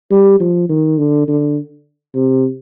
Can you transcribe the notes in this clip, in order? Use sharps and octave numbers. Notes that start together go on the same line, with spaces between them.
G3
F3
D#3
D3
D3
C3